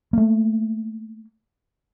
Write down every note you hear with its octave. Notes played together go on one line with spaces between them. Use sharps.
A3 A#3